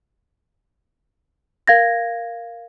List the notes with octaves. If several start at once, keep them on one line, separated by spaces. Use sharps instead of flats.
A#4 F5 G#6 A#6